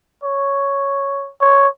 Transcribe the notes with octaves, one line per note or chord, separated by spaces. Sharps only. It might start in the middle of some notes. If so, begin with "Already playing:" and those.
C#5
C#5